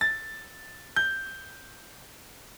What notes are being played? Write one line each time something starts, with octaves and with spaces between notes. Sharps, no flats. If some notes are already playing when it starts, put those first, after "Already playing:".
A6
G6